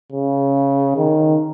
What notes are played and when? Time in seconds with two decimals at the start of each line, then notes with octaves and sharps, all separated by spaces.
0.12 C#3
0.97 D#3